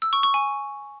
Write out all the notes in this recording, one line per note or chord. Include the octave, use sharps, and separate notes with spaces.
E6
C#6
C#6
G#5